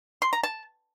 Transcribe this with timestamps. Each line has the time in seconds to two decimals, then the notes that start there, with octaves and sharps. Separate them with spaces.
0.22 C6
0.33 A#5
0.43 A5